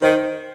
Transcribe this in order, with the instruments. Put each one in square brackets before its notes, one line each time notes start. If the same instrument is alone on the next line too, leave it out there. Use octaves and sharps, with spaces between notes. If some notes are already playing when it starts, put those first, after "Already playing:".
[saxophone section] D#3 [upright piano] C5